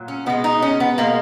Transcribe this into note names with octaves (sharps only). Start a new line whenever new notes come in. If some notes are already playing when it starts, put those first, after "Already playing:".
Already playing: A#2 F#3
C#4
B2 G#3 B3
D#4
C#4
B3
B2 G#3 A#3